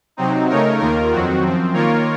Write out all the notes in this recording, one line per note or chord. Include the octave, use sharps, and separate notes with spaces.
C3 F#3 C4 D#4
C#3 A3 D#4 A#4 C#5
D#2 D#3 A#3 F4 A#4
F2 D#3 F#3 C4 F#4
F#2 F3 C4
D#3 A#3 F4 A#4 C#5